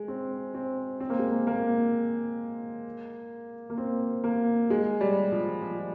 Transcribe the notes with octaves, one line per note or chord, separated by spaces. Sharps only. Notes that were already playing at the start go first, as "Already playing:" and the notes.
Already playing: G#3
C4
C4
C4
A#3
G#3
A#3
A#3
A#3
C4
A#3
G#3
G3
F3
F3